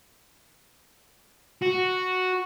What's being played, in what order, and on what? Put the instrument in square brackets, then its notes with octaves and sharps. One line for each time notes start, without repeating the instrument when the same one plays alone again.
[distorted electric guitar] F#4